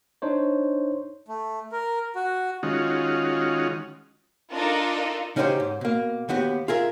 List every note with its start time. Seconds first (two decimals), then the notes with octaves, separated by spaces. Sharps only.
0.22 D4 D#4 C5 C#5
1.28 A3
1.72 A#4
2.15 F#4
2.63 D#3 G#3 C#4 D#4 F4 F#4
4.51 D4 D#4 F4 A4 A#4
5.36 C#3 C#4 D#4 F#4 G4 C5
5.60 G#2
5.81 B2 A#3
6.29 D#2 B3 F#4 G4
6.68 F4 G#4 A#4 E5